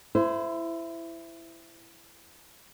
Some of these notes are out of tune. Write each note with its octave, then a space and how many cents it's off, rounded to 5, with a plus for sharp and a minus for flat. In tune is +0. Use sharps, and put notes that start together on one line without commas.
E4 +15 C5 -20